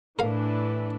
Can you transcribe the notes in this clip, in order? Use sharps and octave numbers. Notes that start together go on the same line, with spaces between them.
A2 E3 D4 A#4 B4 F5